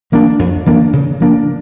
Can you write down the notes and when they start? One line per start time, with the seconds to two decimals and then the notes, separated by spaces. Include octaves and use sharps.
0.12 E3 A#3 D4
0.39 F2
0.66 E3 A#3 D4
0.93 C#3
1.20 F3 A#3 D4